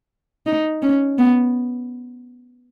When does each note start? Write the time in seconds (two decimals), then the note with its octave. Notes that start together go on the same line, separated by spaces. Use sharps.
0.46 D#4
0.82 C#4
1.18 B3